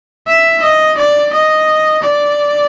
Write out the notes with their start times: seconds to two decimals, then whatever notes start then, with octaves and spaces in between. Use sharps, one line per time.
0.27 E5
0.62 D#5
0.97 D5
1.33 D#5
2.02 D5